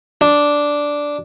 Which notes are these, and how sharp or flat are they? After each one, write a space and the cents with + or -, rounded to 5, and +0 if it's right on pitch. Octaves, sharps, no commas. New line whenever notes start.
D4 -5